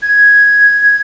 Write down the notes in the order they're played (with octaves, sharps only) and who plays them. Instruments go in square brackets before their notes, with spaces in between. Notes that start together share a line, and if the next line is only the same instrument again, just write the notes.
[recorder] G#6